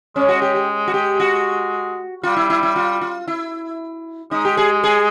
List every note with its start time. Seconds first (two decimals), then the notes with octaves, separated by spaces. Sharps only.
0.16 G#3 C#4
0.29 F#4
0.42 G4
0.55 G4
0.88 F#4
0.94 G4
1.20 F#4
2.23 G3 F4
2.37 E4
2.50 E4
2.63 E4
2.76 F4
3.01 F4
3.28 E4
4.31 G#3 D#4
4.45 G4
4.57 G#4
4.84 G#4